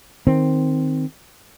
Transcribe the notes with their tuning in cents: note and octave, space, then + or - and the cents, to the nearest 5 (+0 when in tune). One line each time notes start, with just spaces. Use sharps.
D#3 +0 C4 +0